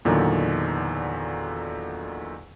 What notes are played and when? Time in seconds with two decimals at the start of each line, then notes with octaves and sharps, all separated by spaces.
0.05 E2 A#2 D3 D#3 F#3